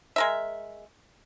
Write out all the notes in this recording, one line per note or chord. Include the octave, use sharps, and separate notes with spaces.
G#3 A#4 E5